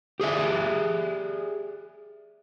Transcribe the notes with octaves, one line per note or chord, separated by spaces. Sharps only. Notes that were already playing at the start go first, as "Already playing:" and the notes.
G4 G#4 D5 E5